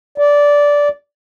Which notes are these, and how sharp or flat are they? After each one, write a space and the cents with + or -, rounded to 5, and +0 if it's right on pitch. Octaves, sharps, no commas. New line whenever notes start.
D5 -15